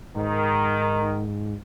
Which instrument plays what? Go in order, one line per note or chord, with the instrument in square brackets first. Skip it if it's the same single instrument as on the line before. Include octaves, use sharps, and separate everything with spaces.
[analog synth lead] G#2 [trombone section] D#3